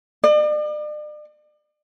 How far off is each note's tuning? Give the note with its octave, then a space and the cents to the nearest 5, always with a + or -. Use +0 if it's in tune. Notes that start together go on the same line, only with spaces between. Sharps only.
D5 +40